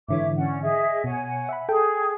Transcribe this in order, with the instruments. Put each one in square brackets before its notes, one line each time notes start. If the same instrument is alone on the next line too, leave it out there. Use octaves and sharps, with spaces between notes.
[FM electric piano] G#2 D3 E3 [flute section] C#5 E5 D6
[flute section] C#4 D5 F#5
G#4 D#5 E5
[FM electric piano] B2 [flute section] C#5 F#5 G#5
[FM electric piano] E5 F#5 B5
[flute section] G#4 [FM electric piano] A4 G5